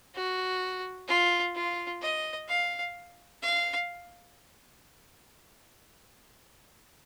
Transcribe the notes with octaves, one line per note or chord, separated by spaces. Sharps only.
F#4
F4
F4
D#5
F5
F5